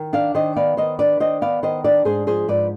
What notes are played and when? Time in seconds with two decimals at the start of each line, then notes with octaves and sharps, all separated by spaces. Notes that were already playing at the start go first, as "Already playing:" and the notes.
Already playing: D#3
0.13 D4 D5 F5
0.34 D#3 C5 D#5
0.56 B3 D5 F5
0.77 D#3 C5 D#5
0.99 D4 B4 D5
1.20 D#3 C5 D#5
1.41 B3 D5 F5
1.63 D#3 C5 D#5
1.84 D4 B4 D5
2.05 G#2 G#4 C5
2.27 F3 G#4 C5
2.48 G#2 B4 D5